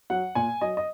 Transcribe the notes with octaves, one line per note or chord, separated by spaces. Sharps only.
F#3 F#5
A#2 G#5
F#3 D#5
D#5